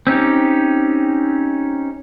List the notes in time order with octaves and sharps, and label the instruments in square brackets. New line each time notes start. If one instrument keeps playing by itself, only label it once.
[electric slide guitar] C4 C#4 D#4 G4